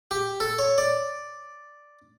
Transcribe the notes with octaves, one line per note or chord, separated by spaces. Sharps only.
G4
A4
C#5
D5